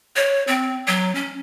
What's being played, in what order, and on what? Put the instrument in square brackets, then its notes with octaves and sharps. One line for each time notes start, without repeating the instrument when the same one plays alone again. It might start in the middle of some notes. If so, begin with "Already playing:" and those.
[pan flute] C#5
C4
F#3
C#4